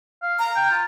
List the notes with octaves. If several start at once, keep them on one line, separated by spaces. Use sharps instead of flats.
F5
A#5
G5
F4